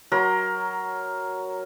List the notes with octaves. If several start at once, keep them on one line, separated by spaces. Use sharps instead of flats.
F#3 A#4 C6